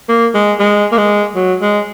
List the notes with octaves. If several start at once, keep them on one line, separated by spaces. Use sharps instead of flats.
A#3
G#3
G#3
A#3
G#3
F#3
G#3